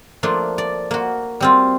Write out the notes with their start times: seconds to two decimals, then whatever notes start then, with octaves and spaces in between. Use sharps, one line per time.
0.23 F3 A3 A#3 D4
0.58 D5
0.91 A#3 F#4
1.40 G3 C4 F4